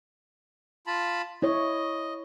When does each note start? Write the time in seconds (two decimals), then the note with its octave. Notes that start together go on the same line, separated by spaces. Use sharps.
0.87 F4 A5 B5
1.42 E4 C#5 D#5